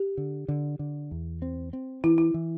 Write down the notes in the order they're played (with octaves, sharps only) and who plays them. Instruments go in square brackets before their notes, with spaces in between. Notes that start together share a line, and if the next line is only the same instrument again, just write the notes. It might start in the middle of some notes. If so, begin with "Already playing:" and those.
Already playing: [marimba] G4
[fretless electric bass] D3
D3
D3
E2
C4
C4
[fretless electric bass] E3 [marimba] E4
[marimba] E4
[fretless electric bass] E3